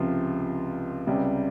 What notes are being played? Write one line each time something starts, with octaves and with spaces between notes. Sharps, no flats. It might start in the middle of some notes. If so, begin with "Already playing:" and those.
Already playing: C#2 C3 F3
C#2 C3 G3